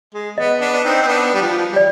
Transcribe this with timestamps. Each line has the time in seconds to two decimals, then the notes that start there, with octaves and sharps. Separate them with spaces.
0.14 G#3
0.38 B3 D#5
0.61 B3 D4
0.73 D4
0.84 C4 D#4
1.02 C4
1.07 B3 D4
1.34 G3
1.42 F3
1.72 G3
1.76 D5